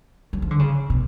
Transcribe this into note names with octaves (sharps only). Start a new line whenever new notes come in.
F#3
F3
D3
C#3
B2